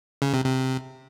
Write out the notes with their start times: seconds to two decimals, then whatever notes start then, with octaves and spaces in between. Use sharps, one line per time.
0.22 C#3
0.34 C3
0.45 C3